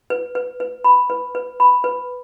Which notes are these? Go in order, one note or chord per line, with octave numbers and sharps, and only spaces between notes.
B4
B4
B4
B5
B4
B4
B5
B4